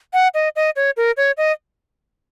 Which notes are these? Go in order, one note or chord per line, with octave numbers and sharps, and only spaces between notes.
F#5
D#5
D#5
C#5
A#4
C#5
D#5